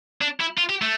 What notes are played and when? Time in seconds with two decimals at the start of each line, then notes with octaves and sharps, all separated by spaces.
0.22 D4
0.40 E4
0.58 F4
0.69 G4
0.82 A3